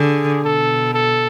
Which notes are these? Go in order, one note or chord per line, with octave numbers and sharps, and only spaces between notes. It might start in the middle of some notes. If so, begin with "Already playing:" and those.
Already playing: D3 G#4
B2 A4
A4